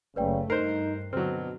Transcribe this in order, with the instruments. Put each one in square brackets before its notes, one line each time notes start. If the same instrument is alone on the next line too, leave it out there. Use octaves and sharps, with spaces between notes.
[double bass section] F#1 A3 [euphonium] C#3 [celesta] B4 D5 G5
[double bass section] G2 [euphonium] D#4 [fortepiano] A#4 C5 [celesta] F#6 C7
[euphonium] B2 [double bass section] D3 [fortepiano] F#3 C4 [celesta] F6